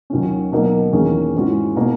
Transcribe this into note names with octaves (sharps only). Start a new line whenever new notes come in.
D#2 D#3 F#3 C#4
B2 F#3 A#3 D#4 A#4
E2 D#3 A#3 C#4 G#4
G#2 E3 G#3 C#4 F#4
B2 A#3 D#4 A#4